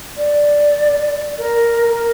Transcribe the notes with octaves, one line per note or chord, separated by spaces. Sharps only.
D5
A#4
A#4